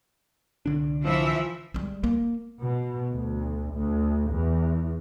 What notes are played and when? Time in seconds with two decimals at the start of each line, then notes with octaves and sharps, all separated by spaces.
0.66 C2 D3 D4
1.04 E3 F3 E5
1.74 G3 G#3
2.04 A#3
2.61 B2
3.13 D2
3.74 D2
4.31 E2